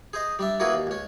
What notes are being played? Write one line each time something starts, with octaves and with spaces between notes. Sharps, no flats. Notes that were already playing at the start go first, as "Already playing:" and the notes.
G#4 C5 D#5
G3 D4 E5
A#3 C#4 E4 F#4 G#4 B4
D#2
C#2 C#4